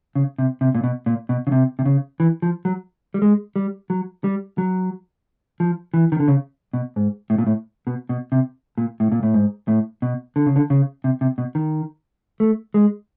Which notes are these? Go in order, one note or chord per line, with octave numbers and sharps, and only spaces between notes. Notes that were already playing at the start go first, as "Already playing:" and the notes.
C#3
C3
C3
A#2
B2
A#2
B2
C#3
C3
C3
C#3
E3
F3
F#3
G3
G#3
G3
F#3
G3
F#3
F3
E3
D#3
D3
C#3
B2
G#2
A2
A#2
A2
B2
B2
C3
A#2
A2
A#2
A2
G#2
A2
B2
D3
C#3
D3
C#3
C3
C3
B2
D#3
A3
G#3